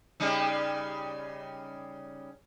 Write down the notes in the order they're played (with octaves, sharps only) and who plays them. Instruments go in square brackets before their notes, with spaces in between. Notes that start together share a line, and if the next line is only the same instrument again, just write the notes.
[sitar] C#3 G3 D#4